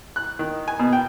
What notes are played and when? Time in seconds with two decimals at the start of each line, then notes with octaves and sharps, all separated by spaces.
0.16 F#6
0.39 D#3
0.68 G#5
0.79 B2
0.93 G5